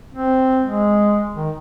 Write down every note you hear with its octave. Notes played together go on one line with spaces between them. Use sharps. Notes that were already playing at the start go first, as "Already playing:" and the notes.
C4
G#3
D#3